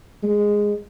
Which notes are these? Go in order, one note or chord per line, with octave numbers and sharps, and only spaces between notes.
G#3